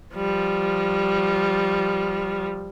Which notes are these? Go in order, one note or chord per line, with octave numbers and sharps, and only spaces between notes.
F3 G3